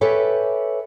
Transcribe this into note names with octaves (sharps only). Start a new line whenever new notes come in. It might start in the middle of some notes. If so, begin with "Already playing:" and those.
G4 A4 B4 C#5 E5 G#5